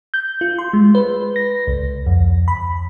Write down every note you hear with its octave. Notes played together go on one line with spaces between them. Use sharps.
G6
F4
C6
G#3
B4
A#6
C#2
F2
B5